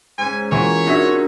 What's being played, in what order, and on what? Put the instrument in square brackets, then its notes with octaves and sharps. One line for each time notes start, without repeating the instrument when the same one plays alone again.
[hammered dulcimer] G#2 C#3 [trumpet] G#5
[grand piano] E3 [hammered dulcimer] A#3 F4 F#4 [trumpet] C#5
[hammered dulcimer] A#2 [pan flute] D4 [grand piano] D#4 F#4 E5